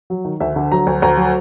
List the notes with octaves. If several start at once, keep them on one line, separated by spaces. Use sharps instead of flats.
F#3
D#3
D2 E5
D3
F#3 A#5
D2
D2 A#5
F#3